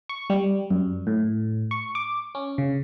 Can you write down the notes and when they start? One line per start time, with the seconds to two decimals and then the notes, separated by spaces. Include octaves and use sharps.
0.09 C#6
0.30 G3
0.70 F#2
1.07 A2
1.71 C#6
1.95 D6
2.35 C#4
2.58 C#3